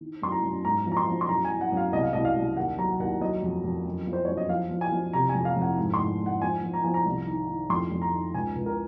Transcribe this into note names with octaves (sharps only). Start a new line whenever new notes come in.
D#3
F#2 C6
A#5
F#2
G#2 A#5
F3
A#5
C6
F3
C6
F#2 A#5
G#5
F#2
F#5
F#2
F5
C2 D#5
F5
C2 D#5
F5
C2
D#2 F#5
F#3 A#5
D#2 F#5
F#3 D#5
F2
F2
F#2
F3
C5
F#2 C#5
D#5
F3 F5
F3
G#5
F3
C3 A#5
G#5
F2
F5
F2
F#5
G#2
C6
G#2
G#2
F#5
F3 G#5
F3
A#5
F3 G#5
A#5
C2
D#3
D#3
F2 C6
F2
A#5
D#3
C#2 G#5
C#2
A#4